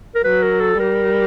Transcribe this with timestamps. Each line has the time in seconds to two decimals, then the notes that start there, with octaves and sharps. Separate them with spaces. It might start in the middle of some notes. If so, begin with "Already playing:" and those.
0.15 A#4
0.24 F#3 B4
0.43 A#4
0.60 A4
0.79 G3 A#4